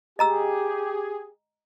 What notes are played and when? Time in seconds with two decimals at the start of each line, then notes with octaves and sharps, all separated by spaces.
0.19 G4 G#4 D#5 A#5 E6